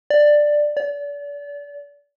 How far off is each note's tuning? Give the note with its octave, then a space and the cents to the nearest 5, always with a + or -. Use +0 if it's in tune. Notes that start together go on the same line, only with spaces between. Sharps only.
D5 +10
D5 -35